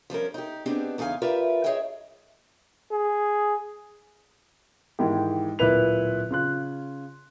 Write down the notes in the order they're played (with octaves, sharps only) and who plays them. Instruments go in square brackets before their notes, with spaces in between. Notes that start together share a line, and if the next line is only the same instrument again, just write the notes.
[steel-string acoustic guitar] F3 G3 C#4 A#4
D#4 G4
B3 C4 D4 D#4 G4 G#4
E2 C#3 D#4 F5 G#5
F4 G4 A#4 B4 D5 E5
G#4 C#5 D#5 E5 G5
[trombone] G#4
[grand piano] G#2 D#3 E3 G#3 G4
D1 A#2 E4 B4 F7
C#3 F4 F#6